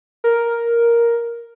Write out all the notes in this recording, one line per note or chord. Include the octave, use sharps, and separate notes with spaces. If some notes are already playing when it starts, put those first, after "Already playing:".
A#4